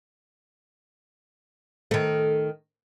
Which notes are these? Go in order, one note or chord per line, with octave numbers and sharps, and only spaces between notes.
D#3 A3